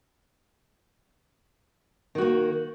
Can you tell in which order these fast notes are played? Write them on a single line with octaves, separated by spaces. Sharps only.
D#3 F#4 A#3